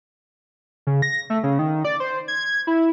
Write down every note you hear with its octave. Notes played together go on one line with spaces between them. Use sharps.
C#3
A#6
A3
C#3
D#3
D5
C5
G#6
E4